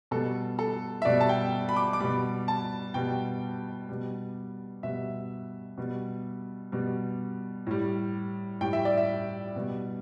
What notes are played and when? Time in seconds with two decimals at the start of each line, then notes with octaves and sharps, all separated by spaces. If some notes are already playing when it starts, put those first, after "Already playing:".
0.11 B2 G3 A4
0.59 A4
1.02 E5
1.05 B2 G3 D5
1.21 A5
1.29 G5
1.69 B5
1.77 D6
1.93 D6
2.00 B2 G3 B5
2.48 A5
2.94 B2 G3 G5
3.89 B2 G3
4.83 B2 G3 E5
5.78 B2 G3
6.72 B2 G3
7.67 A2 G3
8.61 A2 G3 G5
8.73 E5
8.85 D5
8.97 E5
9.56 B2 G3